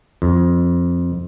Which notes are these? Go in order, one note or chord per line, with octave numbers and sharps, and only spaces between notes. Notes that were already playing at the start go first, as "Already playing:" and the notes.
F2